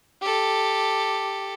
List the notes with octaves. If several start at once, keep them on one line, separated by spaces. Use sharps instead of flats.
G4 A4